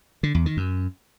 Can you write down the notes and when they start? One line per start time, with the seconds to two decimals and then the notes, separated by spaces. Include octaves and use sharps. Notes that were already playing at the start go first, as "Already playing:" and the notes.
0.23 D3
0.35 E2
0.46 D#3
0.57 F#2